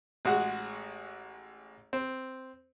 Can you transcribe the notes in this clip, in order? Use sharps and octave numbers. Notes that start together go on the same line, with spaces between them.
A1 G#3 F#4 G#4 F#5
C4